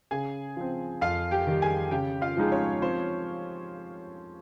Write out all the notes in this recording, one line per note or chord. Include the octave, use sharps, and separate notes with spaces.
C#3 G#4 G#5
F3 C4
F2 F4 F5
G4 G5
D#3 G3
G#4 G#5
C#3 G4 G5
F4 F5
F3 G#3 D#4 G#4
C#4 C#5
F3 C4 C5